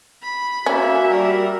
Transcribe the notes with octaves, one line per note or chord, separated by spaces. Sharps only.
B5
A#3 C#4 F#4 E5
G3 A#4